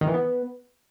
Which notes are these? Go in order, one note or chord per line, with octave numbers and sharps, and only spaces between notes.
D#3
E3
B3